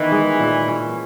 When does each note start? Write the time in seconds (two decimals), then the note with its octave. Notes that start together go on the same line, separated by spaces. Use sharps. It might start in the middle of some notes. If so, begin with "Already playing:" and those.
Already playing: D#3 E3 B3
0.12 G#3
0.40 A#2
0.68 C#4